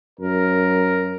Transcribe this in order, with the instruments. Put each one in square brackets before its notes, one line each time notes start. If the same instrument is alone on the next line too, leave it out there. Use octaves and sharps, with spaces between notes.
[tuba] F#2 [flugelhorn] A#4